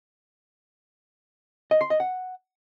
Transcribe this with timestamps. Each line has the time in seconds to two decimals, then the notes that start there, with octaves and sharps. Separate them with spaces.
1.71 D#5
1.81 C6
1.90 D#5
2.00 F#5